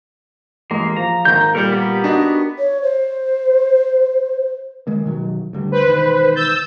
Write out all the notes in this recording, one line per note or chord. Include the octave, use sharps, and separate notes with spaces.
A1 G#3 A#3
F3 A#5
G#1 A#3 A#5 G6
A#2 G3 A4 A#4 G6
B3 G4 A#4
D4 D#4 F#4
C#5
C5
D#3 G#3 A#3
B2 D#3 F#3
D2 D3 G3
B4 C5
E1 D#3
E6 G6 A6